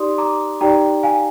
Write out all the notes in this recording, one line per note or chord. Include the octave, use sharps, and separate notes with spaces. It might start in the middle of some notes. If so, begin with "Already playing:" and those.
Already playing: D#4 G4 D5 C6 D#6
A#5 D6
D#4 G4 D5 G5 A#5
F5 G#5